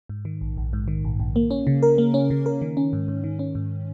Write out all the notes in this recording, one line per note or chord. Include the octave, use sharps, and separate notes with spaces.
G#2
D#3
A#1
A#1
G#2
D#3
A#1
A#1
A#3
C#4
C#3
A#4
A#3
C#4
C#3
A#4
D#3
C#4
G#2
G#2
D#3
C#4
G#2